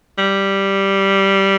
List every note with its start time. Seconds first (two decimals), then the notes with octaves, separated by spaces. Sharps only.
0.18 G3